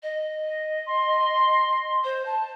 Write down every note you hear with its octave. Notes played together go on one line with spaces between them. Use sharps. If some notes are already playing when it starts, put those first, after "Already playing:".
D#5
C6
C5
A5